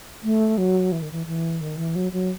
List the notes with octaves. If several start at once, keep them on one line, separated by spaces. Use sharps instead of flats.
A3
F#3
E3
D#3
E3
E3
D#3
E3
F#3
F#3